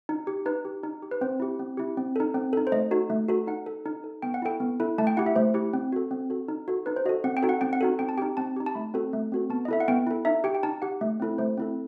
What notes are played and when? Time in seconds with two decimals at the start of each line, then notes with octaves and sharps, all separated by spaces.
0.09 D#4
0.27 G4
0.46 D#4 B4
0.65 G4
0.83 D#4
1.02 G4
1.11 B4
1.21 C4 C5
1.40 E4 G4
1.59 C4
1.77 E4 G4
1.97 C4
2.16 D#4 A4
2.34 C4
2.53 D#4 A4
2.67 C5
2.72 A3 D#5
2.91 D#4 F#4 A4
3.10 A3
3.28 D#4 F#4 A4
3.47 D#4 F#5
3.66 A4
3.86 D#4
4.04 A4
4.22 B3 G5
4.34 F#5
4.42 E4 A4 G5
4.60 B3
4.80 E4 A4
4.98 A3 A5
5.07 G5
5.17 E4 G4 F#5
5.26 E5
5.36 A3 C5
5.54 E4 G4
5.73 C4
5.92 F#4 A4
6.11 C4
6.30 F#4 A4
6.48 D#4
6.68 F#4 A4
6.86 D#4 B4
6.96 C5
7.05 F#4 D#5
7.09 A4
7.24 C4 F#5
7.37 G5
7.43 D#4 F#4 A4
7.49 F#5
7.61 C4 G5
7.73 F#5
7.81 D#4 F#4 A4
7.99 C4 G5
8.09 A5
8.17 D#4 G4 G5
8.37 C4 A5
8.56 D#4 G4
8.66 A5
8.75 A3 B5
8.94 C4 F#4 A4
9.13 A3
9.32 C4 F#4 A4
9.50 B3 A5
9.65 D#5
9.68 E4 A4 E5
9.80 F#5
9.88 B3 G5
10.07 E4 A4
10.25 D#4 E5
10.44 G4 G5
10.55 G5
10.63 D#4 A5
10.82 G4 F#5
11.01 A3
11.20 C4 E4 A4
11.38 A3 C5
11.57 C4 E4 A4